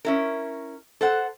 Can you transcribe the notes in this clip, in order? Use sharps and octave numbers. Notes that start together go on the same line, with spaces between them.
C#4 E4 A#4
A4 C5 F#5